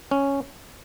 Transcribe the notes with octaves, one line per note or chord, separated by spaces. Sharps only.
C#4